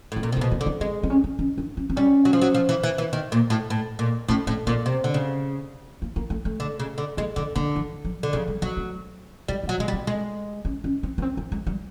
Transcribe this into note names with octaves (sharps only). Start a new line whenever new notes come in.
A2 B3
A#2 A#3
C3
A#3
B2
A#3
D3
B3
G#3 C4
C4
C#4
C4
C#4
D4
C#4
C4
G3 C#4
F#3
F3
F#3
F3
E3
E3
E3
D#3
A#2
A2
A2
A#2
A2 C#4
A2 C4
A#2 B3
C3
D3
C#3
A#3
A#3
A3
A3
D3
C#3
D3
G#3 A#3
D3 B3
D3 A#3
E3
F#3
D3
C#3 F3
G3
F#3 G#3
A3
G3 G#3
A#3
F#3
G#3 B3
G3
C4
G#3
C#4
C#4
C4
B3
C4
B3
G#3
G3